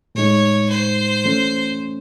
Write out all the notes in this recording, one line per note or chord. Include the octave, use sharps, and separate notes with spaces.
A2 G#3 D#4 C#5
C5
E3 A3 C#4